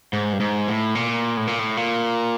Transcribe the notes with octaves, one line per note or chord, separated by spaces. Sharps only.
G#2
G2
G#2
A2
A#2
A2
A#2
A2
A#2